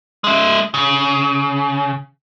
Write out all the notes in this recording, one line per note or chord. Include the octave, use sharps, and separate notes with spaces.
G#3 E5
C#3